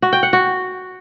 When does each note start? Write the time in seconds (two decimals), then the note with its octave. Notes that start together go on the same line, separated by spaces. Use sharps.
0.02 F#4
0.13 G5
0.23 F#5
0.33 F#4